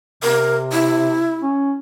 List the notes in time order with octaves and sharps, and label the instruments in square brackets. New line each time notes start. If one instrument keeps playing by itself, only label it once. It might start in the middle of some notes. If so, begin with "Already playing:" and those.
[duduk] C3 [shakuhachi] A#4
[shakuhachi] E4
[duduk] C#4